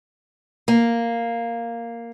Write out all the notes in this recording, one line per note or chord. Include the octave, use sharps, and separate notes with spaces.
A#3